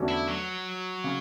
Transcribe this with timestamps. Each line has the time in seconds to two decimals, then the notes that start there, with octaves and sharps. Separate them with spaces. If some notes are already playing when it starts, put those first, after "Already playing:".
Already playing: E2 D3 A3 C#4 F#4
0.09 E4
0.28 F#3
1.04 C#3